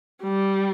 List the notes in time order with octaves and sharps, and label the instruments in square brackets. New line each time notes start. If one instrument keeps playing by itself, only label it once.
[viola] G3